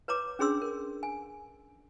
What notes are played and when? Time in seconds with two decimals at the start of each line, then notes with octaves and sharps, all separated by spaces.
0.08 B4 C#5 A#5 D6
0.39 C#4 D4 G#4 C#5 C6 E6
0.62 A#4
1.03 G#5